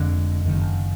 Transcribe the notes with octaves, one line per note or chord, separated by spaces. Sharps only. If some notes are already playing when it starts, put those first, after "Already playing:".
Already playing: F1 F2 D3 G#3
F#1 F#2 D#3